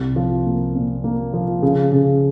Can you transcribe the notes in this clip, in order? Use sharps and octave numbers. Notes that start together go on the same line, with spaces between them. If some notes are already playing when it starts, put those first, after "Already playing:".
Already playing: C2
F3
A#3
A#2
A#3
F3
C#3
C#3